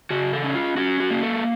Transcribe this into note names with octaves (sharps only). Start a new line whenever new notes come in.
C#3 F#4
A4
C#4
F4
C#4 F#4
F#4
A#3
A4